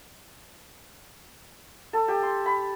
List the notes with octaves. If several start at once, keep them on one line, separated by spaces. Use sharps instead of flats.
A4
G4
C6
B5